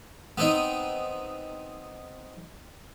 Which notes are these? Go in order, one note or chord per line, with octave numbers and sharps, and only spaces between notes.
B3 C4 D#4